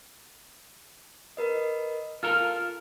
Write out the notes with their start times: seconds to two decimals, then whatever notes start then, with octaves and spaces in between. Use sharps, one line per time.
1.37 A#4 B4 D#5
2.23 F4 A4 A#4 F6